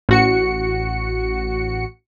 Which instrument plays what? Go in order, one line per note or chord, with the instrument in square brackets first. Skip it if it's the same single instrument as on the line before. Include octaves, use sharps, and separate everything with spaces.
[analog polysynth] A1 F#4 C#7